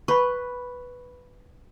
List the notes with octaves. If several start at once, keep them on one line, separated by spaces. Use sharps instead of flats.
B4 B5 C#6